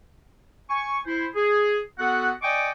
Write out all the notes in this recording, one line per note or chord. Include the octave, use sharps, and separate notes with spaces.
G#5 C#6
E4 C5
G#4
B3 F#4 A4 F#5
D5 D#5 G5 G#5 C#6 D6